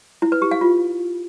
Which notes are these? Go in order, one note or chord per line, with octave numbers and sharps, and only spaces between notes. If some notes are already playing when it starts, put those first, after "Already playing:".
E4
B4
G4
F5
F4